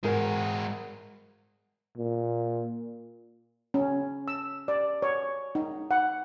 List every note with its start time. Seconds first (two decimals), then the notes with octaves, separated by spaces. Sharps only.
0.04 G#2 G#3 F#4 A#4
1.97 A#2
3.74 C#4
4.28 E6
4.68 D5
5.02 C#5
5.55 D#4
5.91 F#5